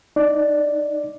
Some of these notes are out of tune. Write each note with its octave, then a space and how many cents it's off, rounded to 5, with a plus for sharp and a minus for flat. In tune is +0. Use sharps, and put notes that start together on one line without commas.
D#4 -10 D5 +0